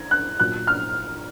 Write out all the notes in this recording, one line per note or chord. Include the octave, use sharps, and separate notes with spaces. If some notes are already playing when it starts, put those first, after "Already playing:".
Already playing: G#6 A#6
F#6
A#2 F#3 F#6
F6